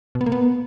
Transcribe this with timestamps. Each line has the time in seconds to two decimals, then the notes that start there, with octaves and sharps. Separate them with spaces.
0.15 B2
0.21 B3
0.26 A#3
0.32 B3